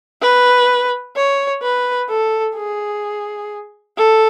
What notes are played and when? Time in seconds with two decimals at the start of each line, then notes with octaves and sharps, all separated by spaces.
0.21 B4
1.16 C#5
1.62 B4
2.09 A4
2.56 G#4
3.97 A4